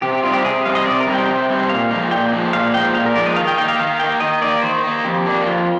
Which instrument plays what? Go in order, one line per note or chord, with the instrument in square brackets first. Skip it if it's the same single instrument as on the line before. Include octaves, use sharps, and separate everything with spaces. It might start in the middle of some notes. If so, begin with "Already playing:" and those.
[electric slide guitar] C3 [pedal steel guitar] G4
[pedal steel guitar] G4
[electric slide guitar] G3 C4 D#4 [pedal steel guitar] F4
[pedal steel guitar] G4
[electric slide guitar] C3 [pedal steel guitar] G#4
[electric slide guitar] G3 C4 D#4 [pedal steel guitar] F5
[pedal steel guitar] D#5
[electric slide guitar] C3 [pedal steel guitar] D5
[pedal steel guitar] A#4
[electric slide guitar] G3 C4 D#4
[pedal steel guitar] G5
[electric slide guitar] C3
G3 C4 D#4
[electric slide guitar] A#2 [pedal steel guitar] F5
[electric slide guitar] F3 G#3 D#4
[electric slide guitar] A#2 [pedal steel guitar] G5
[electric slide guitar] F3 G#3 D#4
[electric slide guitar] A#2 [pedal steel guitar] F5
[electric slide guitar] F3 G#3 D#4 [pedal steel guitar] G5
[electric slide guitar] A#2 [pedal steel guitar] F5
[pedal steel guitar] A#4
[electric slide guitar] F3 G#3 D#4 [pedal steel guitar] D5
[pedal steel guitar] D#5
[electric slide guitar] D#3 [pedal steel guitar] F5
[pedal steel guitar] G5
[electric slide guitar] A#3 D#4 [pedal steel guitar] G5
[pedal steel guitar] F5
[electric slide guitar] D#3 [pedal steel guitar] F5
[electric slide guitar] A#3 D#4 [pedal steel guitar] G5
[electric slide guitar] D#3 [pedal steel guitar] D#5
[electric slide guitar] A#3 D#4 [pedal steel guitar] D5
[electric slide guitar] D#3 [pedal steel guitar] C5
[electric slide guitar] A#3 D#4
[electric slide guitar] F2 [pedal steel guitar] G4
[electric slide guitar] D#3 A#3 D4
[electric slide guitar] F2 [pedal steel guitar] F4